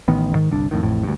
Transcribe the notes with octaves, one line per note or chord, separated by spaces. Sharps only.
A1 D#3 B3
G#2 D#3
G1 C2 D4
F2 A2 D#3
A1 F2 A2
D2 G2